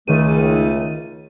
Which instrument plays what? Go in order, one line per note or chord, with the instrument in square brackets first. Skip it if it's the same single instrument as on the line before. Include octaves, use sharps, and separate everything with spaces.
[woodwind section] C#2 A3 [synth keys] D#3 D#7